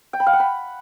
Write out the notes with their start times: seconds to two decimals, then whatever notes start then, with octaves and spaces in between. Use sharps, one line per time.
0.13 G5
0.20 B5
0.27 F5
0.33 F#5
0.40 B5